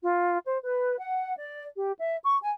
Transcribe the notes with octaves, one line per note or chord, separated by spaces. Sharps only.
F4
C5
B4
F#5
D5
G4
E5
C#6
G#5